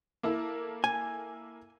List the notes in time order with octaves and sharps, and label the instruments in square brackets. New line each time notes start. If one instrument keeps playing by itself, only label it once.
[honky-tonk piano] A#3 E4 A4
[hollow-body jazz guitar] G#5